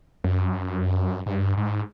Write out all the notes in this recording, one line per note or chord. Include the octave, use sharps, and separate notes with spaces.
F#2
G#2
G2
G#2